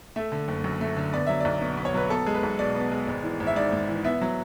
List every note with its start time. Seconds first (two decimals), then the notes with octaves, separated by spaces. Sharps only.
0.16 A3 E5
0.32 D3
0.48 F#1
0.64 F#2
0.81 A3
0.97 D3
1.13 B3 D5
1.27 F#3 E5
1.40 B1 D5
1.62 B2
1.77 B3
1.85 C#5
1.94 F#3 B4
2.10 B3 A4
2.26 G#3
2.35 B4
2.43 B1
2.59 B2 D5
2.75 B3
2.91 G#3
3.08 G#1
3.24 E3
3.40 G#1
3.47 E5
3.56 G#2 D5
3.72 G#1
3.89 E3
4.04 B3 E5
4.21 F#3